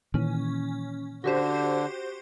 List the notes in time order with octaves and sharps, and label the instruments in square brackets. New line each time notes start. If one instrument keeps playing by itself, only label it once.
[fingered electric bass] A#2 D#3 E3 [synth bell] C#4
[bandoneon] D3 [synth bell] F#4 G4 C5